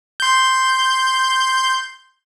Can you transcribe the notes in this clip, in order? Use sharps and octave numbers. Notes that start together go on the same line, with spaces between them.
C6 G6